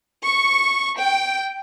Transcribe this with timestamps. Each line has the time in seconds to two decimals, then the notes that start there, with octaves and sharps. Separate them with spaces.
0.23 C#6
0.97 G5